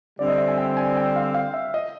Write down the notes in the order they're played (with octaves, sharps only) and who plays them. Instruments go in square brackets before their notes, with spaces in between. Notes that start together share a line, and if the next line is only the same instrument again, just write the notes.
[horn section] D3 G3 C4 [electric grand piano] D5
[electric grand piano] D#5
E5
G#5
G5
G#5
G5
F5
F5
E5
D#5